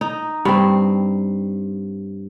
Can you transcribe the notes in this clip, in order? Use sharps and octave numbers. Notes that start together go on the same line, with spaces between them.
D#4
G2 C4